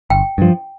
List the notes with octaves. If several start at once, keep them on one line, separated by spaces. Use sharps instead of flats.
G1 G5
G2 F3